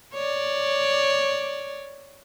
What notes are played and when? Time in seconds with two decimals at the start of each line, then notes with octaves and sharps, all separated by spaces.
0.14 C#5 D5